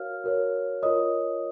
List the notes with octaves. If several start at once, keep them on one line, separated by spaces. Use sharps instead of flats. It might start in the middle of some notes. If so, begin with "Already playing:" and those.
Already playing: F#4 A#4 C#5 F5 F6
F#4 A#4 C#5
F4 A#4 C#5 D#5 D#6